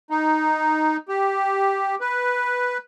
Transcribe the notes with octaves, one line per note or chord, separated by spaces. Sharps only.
D#4
G4
B4